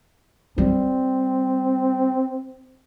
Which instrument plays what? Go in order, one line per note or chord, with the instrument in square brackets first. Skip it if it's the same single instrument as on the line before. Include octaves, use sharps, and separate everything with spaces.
[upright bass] G3 [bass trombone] C4